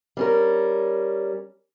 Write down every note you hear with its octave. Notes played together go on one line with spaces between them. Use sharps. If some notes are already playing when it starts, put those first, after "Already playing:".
G3 C#4 A#4